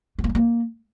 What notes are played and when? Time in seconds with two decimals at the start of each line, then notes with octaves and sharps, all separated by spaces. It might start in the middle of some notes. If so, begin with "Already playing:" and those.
0.19 B3
0.24 A#3
0.29 G#3
0.35 A#3